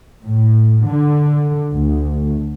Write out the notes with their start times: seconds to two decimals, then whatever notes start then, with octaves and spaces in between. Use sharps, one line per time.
0.24 A2
0.87 D3
1.72 D2